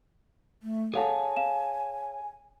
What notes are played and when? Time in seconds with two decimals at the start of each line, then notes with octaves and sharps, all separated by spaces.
0.63 A3
0.94 G#4 A4 C#5 F5 F#5 G#5 A5
1.36 F5 E7